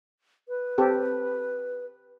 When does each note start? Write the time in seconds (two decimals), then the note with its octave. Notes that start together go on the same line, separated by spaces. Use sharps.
0.49 B4
0.78 C4 G4 A4